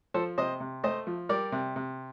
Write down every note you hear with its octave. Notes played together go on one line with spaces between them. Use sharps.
F3 A4 C5
C3 C5 D#5
C3
A3 C5 D#5
F3
G3 A#4 D5
C3
C3